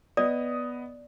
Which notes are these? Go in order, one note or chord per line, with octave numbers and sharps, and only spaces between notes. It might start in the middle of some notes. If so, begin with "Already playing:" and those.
B3 D5 D#5 D#6